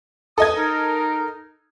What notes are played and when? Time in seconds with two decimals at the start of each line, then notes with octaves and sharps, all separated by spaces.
0.38 A4 D#5 D#6 G#6
0.57 D#4 A#4